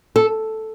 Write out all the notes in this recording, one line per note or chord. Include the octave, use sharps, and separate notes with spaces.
A4